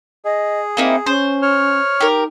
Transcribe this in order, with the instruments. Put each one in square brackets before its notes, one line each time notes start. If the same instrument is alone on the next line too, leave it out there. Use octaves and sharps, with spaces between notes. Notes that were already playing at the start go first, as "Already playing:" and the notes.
[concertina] G#4 [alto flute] D#5
[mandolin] A#3 D#4 E4 [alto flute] C4
[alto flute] C#4 [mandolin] C5
[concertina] C#5 F6
[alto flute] D#4 [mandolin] G4 A#4